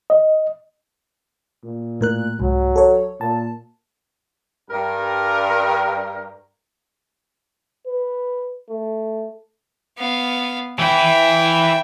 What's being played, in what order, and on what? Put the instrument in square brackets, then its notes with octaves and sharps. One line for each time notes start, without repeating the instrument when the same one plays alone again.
[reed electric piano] D#5
[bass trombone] A#2
[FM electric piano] A2 A#4 F#6
[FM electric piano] C2 G#2 [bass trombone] F#3
[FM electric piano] A4 C#5
[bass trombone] A#2 [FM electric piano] A5
[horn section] G2 A#4
[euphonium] B4
A3
[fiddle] B3 F5
[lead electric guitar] E3 E4 [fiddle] E5 G5